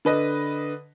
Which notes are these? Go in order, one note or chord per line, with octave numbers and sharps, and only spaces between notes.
D3 B4 D#5